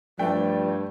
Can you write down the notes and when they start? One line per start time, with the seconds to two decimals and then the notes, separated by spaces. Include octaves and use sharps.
0.19 G2 F3 A3 D5 G5